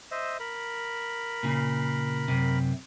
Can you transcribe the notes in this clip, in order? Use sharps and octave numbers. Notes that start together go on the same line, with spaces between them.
C5 D#5 E5
A#4 B5
A#2 C#3
F#2 C3